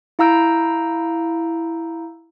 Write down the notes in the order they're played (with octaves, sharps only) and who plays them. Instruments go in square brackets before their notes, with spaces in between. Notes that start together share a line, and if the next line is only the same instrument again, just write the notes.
[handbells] E4 F5 A#5 E6 G6 D7